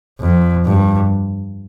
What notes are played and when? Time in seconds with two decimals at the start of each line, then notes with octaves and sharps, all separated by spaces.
0.21 F2
0.66 G2